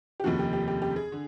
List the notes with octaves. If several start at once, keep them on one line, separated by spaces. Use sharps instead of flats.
G4
F1 D#2 C#3 F3 F#4
G4
G4
G4
G4
G#4
D3